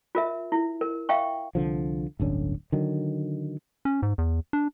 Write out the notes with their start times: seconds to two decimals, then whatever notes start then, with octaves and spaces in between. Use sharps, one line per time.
0.15 F4 A#4 E5
0.52 E4
0.81 A#4
1.09 E5 F5 G5 C#6
1.55 C2 D3 F3
2.20 D1 G1 D3 C#4
2.72 D3 D#3 F#3
3.85 C#4
4.02 G#2
4.18 E2
4.53 D4